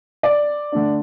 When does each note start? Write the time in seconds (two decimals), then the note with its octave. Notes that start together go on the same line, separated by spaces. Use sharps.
0.23 D5
0.72 D3 A3 D4